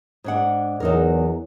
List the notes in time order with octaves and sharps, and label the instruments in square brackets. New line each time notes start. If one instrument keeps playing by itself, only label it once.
[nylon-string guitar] G#2 D4 F#5
[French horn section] E2 [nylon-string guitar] F#3 D#4 A#4